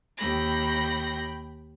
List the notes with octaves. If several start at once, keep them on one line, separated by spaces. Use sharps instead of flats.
D#2 G5 B5 A#6